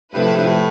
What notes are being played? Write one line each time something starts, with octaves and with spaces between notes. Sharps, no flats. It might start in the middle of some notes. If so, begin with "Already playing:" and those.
G2 C3 F3 A3 E4 B4
A2
G2
A2